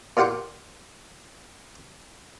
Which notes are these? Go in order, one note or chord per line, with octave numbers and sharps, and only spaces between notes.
A#2 F4 G4 F#5 C6 D6